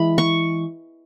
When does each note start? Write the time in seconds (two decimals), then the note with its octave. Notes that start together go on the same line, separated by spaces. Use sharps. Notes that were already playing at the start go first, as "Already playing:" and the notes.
Already playing: E3 G#3 B5
0.18 C#6